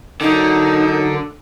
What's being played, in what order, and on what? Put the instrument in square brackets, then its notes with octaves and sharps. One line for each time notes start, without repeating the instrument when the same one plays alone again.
[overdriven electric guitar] D3 [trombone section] F#3 A#4 [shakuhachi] D#4